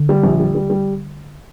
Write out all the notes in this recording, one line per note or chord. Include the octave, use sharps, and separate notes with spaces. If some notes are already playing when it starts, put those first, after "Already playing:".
Already playing: D3
G3
A#1
G3
G3
G3